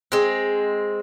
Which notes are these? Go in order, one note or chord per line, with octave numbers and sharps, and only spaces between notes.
G#3 C4